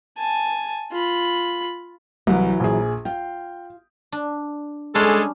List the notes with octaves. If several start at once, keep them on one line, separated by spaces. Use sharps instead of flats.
G#5 A5
F4 B5
C2 E3 F#3
A#1 G#4
F4 G5
D4
G3 G#3 C#4 D4 G#4 A4